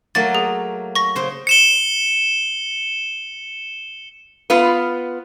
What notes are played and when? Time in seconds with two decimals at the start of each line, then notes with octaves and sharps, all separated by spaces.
0.15 F#3 A3 A#3 A6
0.35 G#4
0.95 C#6 A#6
1.15 C#3 C5
1.47 C#7 E7 G7
4.50 B3 F4 B4